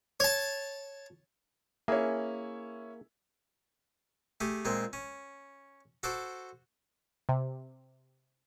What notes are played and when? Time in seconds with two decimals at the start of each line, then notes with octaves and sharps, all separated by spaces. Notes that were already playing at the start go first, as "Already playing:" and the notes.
0.20 C#5 A5
1.88 A#3 C#4 E4 G#4
4.41 A3 G4 G#4
4.65 A#2 G#3 C4
4.93 C#4
6.03 F#4 A4 C5 D6
7.29 C3